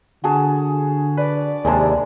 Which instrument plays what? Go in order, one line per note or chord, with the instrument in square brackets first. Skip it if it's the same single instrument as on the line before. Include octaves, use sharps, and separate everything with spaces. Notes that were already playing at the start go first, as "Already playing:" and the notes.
[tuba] D3 [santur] F#4 G#4 A5
[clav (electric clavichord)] B4 [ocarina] D5
[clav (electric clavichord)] D#2 C3 G#3 [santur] G#4 A5